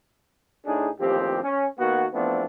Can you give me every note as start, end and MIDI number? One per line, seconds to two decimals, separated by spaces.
0.65 0.89 45
0.65 0.89 62
0.65 0.89 63
0.65 0.89 68
1.00 1.40 33
1.00 1.40 39
1.00 1.40 53
1.00 1.40 60
1.00 1.40 67
1.43 1.67 61
1.79 2.06 51
1.79 2.06 58
1.79 2.06 59
1.79 2.06 66
2.14 2.45 40
2.14 2.45 53
2.14 2.45 57
2.14 2.45 59
2.14 2.45 60
2.14 2.45 62